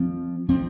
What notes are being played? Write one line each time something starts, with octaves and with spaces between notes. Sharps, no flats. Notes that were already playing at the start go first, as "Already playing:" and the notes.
Already playing: F3 C4
F3 C4